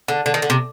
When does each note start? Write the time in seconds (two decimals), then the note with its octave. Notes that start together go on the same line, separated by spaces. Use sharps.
0.08 D3
0.26 D3
0.34 D#3
0.42 D3
0.50 C3